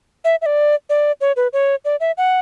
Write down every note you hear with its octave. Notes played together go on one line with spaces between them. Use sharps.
E5
E5
D5
D5
C#5
B4
C#5
D5
E5
F#5